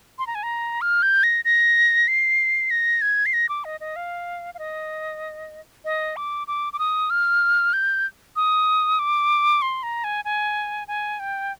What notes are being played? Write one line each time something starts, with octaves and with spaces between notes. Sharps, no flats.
C6
A#5
G#5
A#5
F6
G6
A#6
A#6
C7
A#6
G#6
C7
A#6
D6
D#5
D#5
F5
F5
D#5
D#5
D6
D6
D6
D#6
F6
G6
D#6
D6
C6
A#5
G#5
G#5
G#5
G5